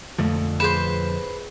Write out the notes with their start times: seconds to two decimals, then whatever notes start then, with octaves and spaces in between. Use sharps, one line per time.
0.18 F2 A#2 D3 F3 A3
0.60 G#4 B4 C5 E7